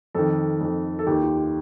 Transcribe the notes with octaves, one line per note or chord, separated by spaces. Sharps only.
F2 D#3 A4
F2 D#3
A4
D#2 D#3 G4
F4
G4